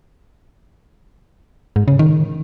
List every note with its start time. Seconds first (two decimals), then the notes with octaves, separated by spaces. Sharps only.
1.76 G#2
1.88 C#3
1.99 D#3